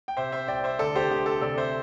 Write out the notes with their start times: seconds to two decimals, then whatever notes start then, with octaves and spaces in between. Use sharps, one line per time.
0.08 G5
0.17 C3 C5 E5
0.32 C5 E5
0.48 C2 D5 G5
0.64 C5 E5
0.79 D2 A4 D5
0.95 G4 C5
1.10 D2 G4
1.26 A4
1.41 C3 A4 D5
1.58 C5 E5